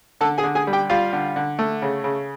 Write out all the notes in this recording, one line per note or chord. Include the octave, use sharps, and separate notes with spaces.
D3 A4 A5
G#4 G#5
D3
G#4 G#5
G3
G4 G5
G3 F4 F5
D3
D3
A3
C#3
C#3